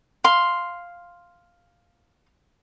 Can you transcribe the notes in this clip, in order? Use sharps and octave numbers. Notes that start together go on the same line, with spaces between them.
F5 C6